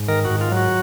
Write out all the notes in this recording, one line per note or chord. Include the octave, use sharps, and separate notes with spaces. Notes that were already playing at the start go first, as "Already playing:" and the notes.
Already playing: G#2
D#3 A#4
F#4
G#2
F4
F#3
F#4